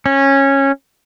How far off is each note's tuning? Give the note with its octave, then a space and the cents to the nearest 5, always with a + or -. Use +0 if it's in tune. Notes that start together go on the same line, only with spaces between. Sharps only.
C#4 -15